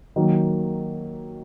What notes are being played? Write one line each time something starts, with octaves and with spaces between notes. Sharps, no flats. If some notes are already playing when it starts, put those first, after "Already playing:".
D#3 F#3 A#3